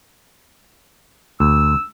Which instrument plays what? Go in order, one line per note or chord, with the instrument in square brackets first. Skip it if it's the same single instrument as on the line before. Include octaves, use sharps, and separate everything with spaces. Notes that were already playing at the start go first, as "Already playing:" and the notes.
[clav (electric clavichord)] D2 [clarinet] E6